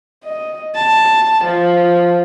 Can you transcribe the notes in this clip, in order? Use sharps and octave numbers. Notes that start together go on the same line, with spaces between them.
D#5
A5
F3